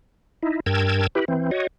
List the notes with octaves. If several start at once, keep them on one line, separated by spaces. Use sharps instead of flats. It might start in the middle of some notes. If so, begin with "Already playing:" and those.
D#4 E4
G2 A#4 G5 A5 E6 G#6
E4 G4 B4
E3 C4
F#4 C#5 D#5